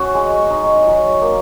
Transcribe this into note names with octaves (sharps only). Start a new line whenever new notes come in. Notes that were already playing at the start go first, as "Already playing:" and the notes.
Already playing: C#4 F#4
G#3
D#4
F#3
A#3